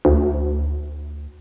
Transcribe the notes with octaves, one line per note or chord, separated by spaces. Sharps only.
D2